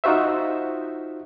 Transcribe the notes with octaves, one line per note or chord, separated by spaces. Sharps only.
D#4 F4 F#4 C5 E5